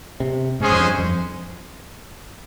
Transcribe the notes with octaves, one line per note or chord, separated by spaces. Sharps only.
C3
G#2 G#3 C#4 G#4 C5
F2
G2
F2